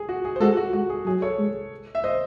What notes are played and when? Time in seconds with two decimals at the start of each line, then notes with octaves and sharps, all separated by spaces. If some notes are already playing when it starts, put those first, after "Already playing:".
Already playing: G#4
0.09 F#4
0.25 G#4
0.36 C5
0.41 G#3 F#4 A4
0.57 F#4
0.73 G#3 F#4
0.90 G#4
1.06 F#3 G#4
1.22 A4 C#5
1.39 G#3
1.95 E5
2.04 C5 D#5